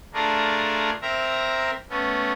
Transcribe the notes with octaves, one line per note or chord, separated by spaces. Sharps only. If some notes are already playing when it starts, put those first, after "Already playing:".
A3 D4 F4 G#4 A#4
C4 A#4 E5 A#5
A3 B3 C#4